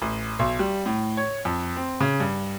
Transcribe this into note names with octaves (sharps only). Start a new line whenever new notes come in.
A1
B1
G3
A2
C#5
F2
C4
C#3
G2